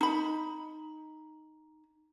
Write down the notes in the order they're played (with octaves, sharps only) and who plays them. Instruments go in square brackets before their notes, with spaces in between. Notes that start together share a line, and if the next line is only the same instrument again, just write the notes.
[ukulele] D#4 B5